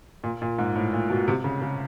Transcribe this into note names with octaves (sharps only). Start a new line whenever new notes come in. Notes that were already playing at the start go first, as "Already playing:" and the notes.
A#2
A#2
G#2
A2
A#2
B2
C3
C#3
C#3